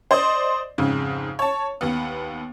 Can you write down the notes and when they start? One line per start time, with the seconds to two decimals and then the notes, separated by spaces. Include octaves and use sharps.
0.11 C5 D5 D#5
0.78 F2 G#2 C#3
1.39 C#5 A5
1.81 D#2 B3